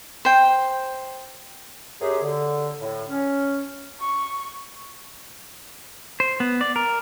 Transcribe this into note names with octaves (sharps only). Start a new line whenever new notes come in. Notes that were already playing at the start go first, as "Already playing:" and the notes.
C5 G5
F#2 G4 G#4
D3
A2
C#4
C#6
C5
B3
D5
A#4